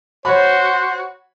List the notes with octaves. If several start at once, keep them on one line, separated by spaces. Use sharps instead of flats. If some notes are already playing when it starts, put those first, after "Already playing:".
F#4 C5 C#5 B5